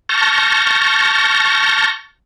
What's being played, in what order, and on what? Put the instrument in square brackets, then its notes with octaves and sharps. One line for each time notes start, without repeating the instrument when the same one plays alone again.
[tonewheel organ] A5 C#6 F6 G6 A#6